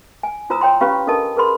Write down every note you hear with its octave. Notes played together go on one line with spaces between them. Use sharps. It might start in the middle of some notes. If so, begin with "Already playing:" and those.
G#5
E4 F4 C5 A#5 D#6 E6
C#5 G5 C6
C#4 G4 B4 F5 B5 C#6
D4 A4 A#4 D#5 A5
G#4 A#4 B4 B5 C6